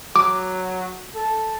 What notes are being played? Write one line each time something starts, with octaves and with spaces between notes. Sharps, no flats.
F#3 D6
A4